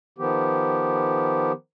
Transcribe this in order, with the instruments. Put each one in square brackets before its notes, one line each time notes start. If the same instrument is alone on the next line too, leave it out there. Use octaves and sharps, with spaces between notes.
[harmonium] D#3 F3 B3 G4